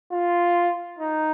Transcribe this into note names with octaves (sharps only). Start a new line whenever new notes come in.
F4
D#4